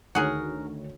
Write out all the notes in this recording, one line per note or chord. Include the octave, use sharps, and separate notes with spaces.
D2 D#3 F#4 G#4 A#4 C#5